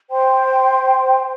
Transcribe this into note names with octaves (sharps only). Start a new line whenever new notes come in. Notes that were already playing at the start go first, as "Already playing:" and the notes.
C5 G5 C6